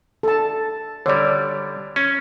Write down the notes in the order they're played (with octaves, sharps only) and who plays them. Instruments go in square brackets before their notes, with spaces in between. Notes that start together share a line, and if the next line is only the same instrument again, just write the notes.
[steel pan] A4 A5
[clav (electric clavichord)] D3 G3 [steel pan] C#5 D5
[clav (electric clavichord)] C#4